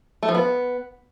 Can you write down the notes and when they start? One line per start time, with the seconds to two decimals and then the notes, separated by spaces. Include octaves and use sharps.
0.23 A3
0.29 F3
0.35 B3